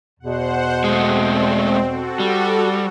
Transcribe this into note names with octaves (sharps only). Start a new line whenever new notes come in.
E2 B2 C5 F#5
G#3 A3 C4
F#4 A4
G3